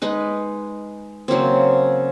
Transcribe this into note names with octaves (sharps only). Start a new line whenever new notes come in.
G#3 D#4 B4
C#3 F#3 A#3 C4